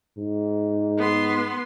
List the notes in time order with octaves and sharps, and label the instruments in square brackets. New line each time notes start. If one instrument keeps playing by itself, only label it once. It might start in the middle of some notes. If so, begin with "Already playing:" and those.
[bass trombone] G#2
[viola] B3 C6